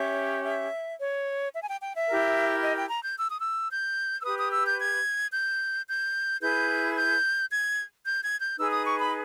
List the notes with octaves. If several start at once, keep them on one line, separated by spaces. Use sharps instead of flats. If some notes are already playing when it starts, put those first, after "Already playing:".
Already playing: C#4 G4 C#5 E5
E5
C#5
E5
G#5
G5
G5
E5
E4 G4 A#4
D#5
G5
A#5
G6
E6
D#6
E6
G6
E6
G4 B4 D#6
D#6
E6
G6
G#6
G6
G6
E4 G#4 B4 G6
G6
G#6
G6
G#6
G6
D#4 G#4 B4 E6
D#6
C#6
B5